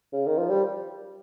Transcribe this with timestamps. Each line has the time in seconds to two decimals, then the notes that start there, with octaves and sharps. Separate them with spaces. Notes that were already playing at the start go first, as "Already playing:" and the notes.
0.13 C#3
0.26 D#3
0.38 F3
0.49 G3